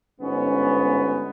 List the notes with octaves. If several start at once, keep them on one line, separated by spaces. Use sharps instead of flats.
G1 G#2 B3 C#4